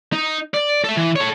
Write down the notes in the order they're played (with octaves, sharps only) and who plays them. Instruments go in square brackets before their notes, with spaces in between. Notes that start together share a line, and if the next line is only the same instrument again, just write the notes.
[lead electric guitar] D#4
D5
A4 E5
E3
A4 C#5